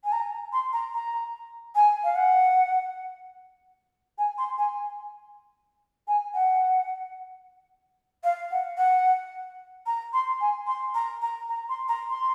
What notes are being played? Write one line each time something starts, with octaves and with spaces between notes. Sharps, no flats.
G#5
A#5
C6
A#5
A#5
G#5
F5
F#5
G#5
C6
G#5
G#5
F#5
F5
F#5
F#5
A#5
C6
G#5
C6
A#5
A#5
A#5
C6
A#5
C6